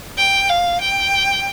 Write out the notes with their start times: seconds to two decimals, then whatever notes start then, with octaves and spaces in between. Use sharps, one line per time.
0.17 G5
0.49 F5
0.81 G5